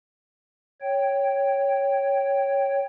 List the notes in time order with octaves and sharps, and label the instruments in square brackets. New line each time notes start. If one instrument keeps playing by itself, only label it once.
[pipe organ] C#5 G5